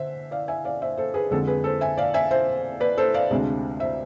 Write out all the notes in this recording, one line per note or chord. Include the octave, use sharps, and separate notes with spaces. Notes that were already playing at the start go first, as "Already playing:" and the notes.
Already playing: D3 C5 E5
D5 F5
E5 G#5
D5 F5
C5 E5
A4 C5
G#4 B4
F2 D3 G#3 C4 A4
G#4 B4
A4 C5
E5 G#5
D5 F5
E5 G#5
C5 E5
B4 D5
A4 C5
D5 F5
D2 C3 G#3 D4
C5 E5